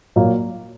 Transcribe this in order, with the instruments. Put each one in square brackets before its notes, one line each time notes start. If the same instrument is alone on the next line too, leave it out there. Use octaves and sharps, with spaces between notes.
[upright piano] A#2 F#3 A#3